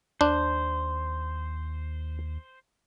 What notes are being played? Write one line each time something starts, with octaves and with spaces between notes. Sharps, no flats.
D#2 D4 C5